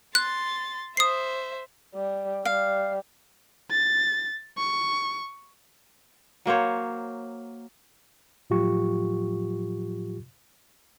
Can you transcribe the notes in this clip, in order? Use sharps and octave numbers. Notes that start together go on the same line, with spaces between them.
C6 F#6 A6
C5 E5 D#6 C7
G3
G3 F5
A6
C#6
F#3 A#3 C5 C#5
A2 F3 F#3 F4 G4 C#6